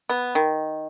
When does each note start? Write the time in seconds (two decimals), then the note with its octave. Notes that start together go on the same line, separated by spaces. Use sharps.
0.09 B3
0.35 D#3